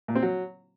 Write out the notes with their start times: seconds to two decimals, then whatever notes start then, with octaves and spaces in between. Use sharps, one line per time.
0.08 A#2
0.15 C4
0.22 F#3